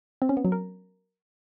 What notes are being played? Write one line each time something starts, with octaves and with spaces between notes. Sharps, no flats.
C4
C#4
B3
F#3
A#4